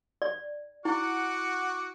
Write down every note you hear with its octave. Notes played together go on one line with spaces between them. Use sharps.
D5
E4 F#4 F#5 D6